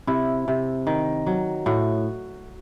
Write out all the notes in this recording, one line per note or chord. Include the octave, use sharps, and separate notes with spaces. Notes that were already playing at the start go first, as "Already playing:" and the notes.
C3 E4
C3
D#3
F#3
A2 F#4